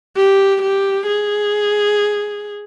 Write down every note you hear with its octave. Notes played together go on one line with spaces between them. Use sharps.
G4
G4
G#4